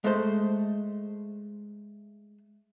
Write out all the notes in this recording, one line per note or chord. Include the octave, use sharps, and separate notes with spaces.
G#3 A3 C5